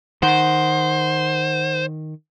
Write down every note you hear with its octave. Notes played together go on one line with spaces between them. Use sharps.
D#3 C5 F#5